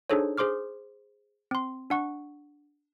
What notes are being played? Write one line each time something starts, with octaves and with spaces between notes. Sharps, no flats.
D4 D#4 G#4 A4 C5 C#5
G#4 C5 C6 D6 F6
C4 C6
D4 F#5 C#6